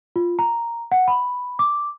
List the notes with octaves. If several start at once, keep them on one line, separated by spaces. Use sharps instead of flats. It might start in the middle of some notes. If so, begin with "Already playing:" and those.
F4
A#5
F#5
B5
D6